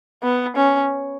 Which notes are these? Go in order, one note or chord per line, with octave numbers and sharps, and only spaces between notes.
B3
C#4